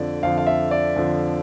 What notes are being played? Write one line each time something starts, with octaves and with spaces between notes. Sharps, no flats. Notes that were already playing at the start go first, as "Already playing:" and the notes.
Already playing: F2 D3 F3 D5
F2 D3 F3 F5
F5
E5
D5
F2 D3 F3